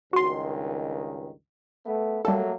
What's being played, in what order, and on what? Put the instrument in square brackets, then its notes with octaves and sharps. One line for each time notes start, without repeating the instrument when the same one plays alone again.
[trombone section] C#2 G2 D#3 [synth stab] F#4 C6
[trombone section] A3 B3
[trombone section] F#3 A3 A#3 [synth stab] G3 A4